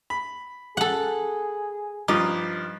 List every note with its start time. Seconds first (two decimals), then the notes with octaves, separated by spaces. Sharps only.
0.10 B5
0.77 G#4 A4 F#5
2.08 G2 F3 D#4 D6